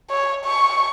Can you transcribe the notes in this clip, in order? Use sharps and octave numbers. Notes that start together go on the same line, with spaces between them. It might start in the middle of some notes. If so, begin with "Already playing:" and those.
C#5
C#6